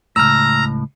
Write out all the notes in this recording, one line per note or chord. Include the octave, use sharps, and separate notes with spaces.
C#2 F#2 A2 A#5 E6 F6